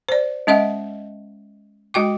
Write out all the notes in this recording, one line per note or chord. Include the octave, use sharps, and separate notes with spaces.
C5 D5
G#3 C#4 D#5 E5 F#5
G#3 F#4 G5 D6